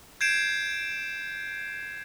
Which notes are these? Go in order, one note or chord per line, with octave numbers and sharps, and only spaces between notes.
G6 G#6 C7 D7 E7